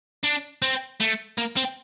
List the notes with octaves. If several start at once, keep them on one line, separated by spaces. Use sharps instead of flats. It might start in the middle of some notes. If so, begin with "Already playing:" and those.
D4
C4
A3
A#3
C4